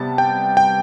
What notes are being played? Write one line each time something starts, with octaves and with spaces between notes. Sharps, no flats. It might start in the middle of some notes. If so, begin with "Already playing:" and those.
Already playing: C3 G3 B3 A5
G5
G5